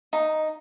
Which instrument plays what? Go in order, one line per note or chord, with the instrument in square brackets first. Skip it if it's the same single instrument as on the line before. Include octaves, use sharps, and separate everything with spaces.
[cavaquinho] D#4